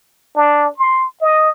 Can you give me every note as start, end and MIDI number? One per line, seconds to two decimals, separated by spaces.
0.36 0.68 62
0.78 1.04 84
1.22 1.50 75